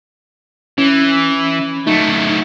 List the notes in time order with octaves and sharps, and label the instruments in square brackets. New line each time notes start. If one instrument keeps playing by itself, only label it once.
[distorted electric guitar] E3 [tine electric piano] C#4
[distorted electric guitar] F#3 A3 [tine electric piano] D#4